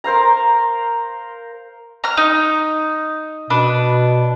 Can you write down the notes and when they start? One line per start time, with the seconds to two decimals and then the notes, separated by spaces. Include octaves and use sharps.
0.04 A#4 C5 F5 A#5
2.04 A#5 F6
2.17 D#4
3.50 B2 D4 B4